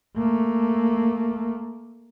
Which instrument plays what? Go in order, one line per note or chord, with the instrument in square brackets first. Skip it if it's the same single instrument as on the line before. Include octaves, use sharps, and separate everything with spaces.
[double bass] A3 A#3